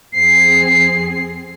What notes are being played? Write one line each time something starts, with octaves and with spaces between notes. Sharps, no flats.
F2 C4 G#4 C7